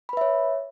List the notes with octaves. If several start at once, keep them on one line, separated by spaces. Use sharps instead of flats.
B4 C#5 E5 B5